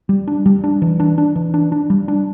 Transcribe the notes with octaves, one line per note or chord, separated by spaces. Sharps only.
G3
D4
G3
D4
E3
D4
D4
E3
D4
D4
G3
D4